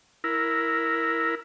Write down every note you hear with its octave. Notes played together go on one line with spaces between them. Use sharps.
E4 A#4